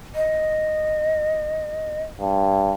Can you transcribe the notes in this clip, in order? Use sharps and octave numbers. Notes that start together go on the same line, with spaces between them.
D#5
G2